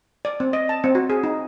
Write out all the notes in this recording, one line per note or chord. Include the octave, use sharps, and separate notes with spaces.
D5
C4
D#5
A5
C4
F#4
G#4
D#4